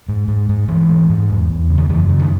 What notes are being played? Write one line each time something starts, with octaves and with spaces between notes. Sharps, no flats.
G#2
G#2
G#2
G#2 E3
G#2
G#2
E2
E2
C#3
D#3
F#2 E3
C#3
D#3